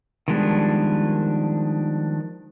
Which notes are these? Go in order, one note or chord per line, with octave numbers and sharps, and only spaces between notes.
D#3 F3 G3 G#3 B3 D4